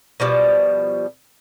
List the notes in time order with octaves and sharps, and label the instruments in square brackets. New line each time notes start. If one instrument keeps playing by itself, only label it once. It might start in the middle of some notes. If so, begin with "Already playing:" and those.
[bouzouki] B2 F3 G3